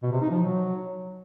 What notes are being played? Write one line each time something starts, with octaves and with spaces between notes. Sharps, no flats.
B2
C3
D#4
F3
F#3